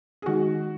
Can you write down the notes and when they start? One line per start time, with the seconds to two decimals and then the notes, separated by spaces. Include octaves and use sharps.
0.22 G#4
0.26 D#3 G#3 D#4 F#4